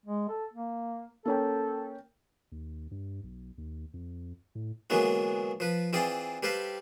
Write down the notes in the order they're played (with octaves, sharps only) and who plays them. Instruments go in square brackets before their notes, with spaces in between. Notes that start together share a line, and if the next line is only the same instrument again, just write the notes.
[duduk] G#3
A4
A#3
[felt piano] A#3 C#4 G5 [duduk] A4
[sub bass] D#2
G2
B1
D#2
F2
A2
[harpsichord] D3 E3 F#3 G#3 A#3 B3
F3 B4
E3 C4 F4 G#4 D5
G3 G4 A4 B4 C5 F5